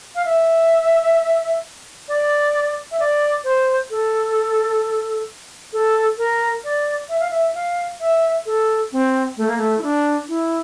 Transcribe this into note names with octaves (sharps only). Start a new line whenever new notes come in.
F5
E5
D5
E5
D5
C5
A4
A4
A#4
D5
E5
F5
E5
F5
E5
A4
C4
A3
A#3
A3
E4
D4
E4